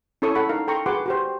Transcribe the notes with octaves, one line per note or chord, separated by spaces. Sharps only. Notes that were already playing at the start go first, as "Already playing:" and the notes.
C#4 E4 A4 C#5 C#6 D#6
A4 F#5 B5
D#4 A#4 F5
A4 G5 A#5 C6 C#6
F#4 G#4 B4 F#5 C6 D6
F#4 G4 C5